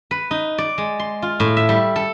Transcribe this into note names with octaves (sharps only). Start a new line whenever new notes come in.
B4
D#4
D5
G#3
C6
F4
A2
E5
G3
A4